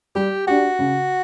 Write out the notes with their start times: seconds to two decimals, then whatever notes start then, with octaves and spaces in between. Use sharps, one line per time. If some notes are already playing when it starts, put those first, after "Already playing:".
0.15 G3 G4
0.47 D4 F#4 G4
0.79 C#3